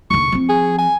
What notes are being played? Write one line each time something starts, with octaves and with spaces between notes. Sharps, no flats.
D#2 D3 C#6
F3 C4
G#4
G#5